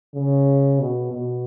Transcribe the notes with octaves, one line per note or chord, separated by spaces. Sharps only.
C#3
B2
B2